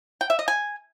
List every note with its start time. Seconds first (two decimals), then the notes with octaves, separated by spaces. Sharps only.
0.21 G5
0.30 E5
0.39 D#5
0.48 G#5